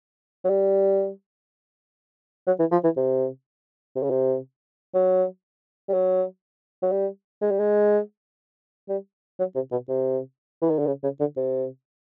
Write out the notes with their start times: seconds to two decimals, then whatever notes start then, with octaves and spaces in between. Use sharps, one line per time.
0.44 F#3
0.49 G3
2.47 F#3
2.59 E3
2.72 F3
2.84 E3
2.97 C3
3.95 C3
4.03 C#3
4.10 C3
4.94 F#3
5.88 G3
5.93 F#3
6.82 F#3
6.92 G3
7.41 G#3
7.51 G3
7.59 G#3
8.89 G3
9.39 F#3
9.55 C3
9.71 B2
9.88 C3
10.61 E3
10.70 D#3
10.79 D3
10.87 C#3
11.03 C#3
11.20 D3
11.36 C3